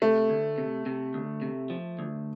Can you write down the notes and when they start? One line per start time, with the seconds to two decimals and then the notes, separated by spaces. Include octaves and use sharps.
0.02 C3 A3
0.30 D2
0.58 C3
0.86 C3
1.14 D2
1.42 C3
1.70 F3
1.99 D2